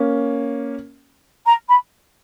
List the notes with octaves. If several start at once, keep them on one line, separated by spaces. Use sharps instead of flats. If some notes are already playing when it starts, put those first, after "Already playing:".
Already playing: A#3 C#4
A#5
B5